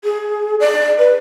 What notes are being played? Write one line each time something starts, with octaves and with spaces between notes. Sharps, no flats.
G#4
D5
B4